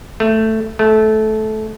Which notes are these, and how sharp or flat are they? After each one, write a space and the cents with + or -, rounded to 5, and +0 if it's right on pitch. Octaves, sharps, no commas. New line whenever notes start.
A3 +5
A3 -20